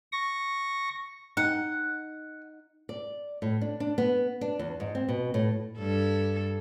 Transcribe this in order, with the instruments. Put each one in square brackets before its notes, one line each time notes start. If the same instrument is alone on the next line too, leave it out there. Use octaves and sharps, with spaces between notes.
[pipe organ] C#6 A#6
[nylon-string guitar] D#4 [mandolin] F#5
[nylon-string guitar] D5
A2
D4
D4
B3
D4
E2
G#2
C4
B2
A2
[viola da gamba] G2 A4